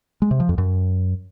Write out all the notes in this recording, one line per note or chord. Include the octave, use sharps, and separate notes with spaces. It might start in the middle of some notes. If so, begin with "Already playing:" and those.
G#3
C3
F3
F2
F#2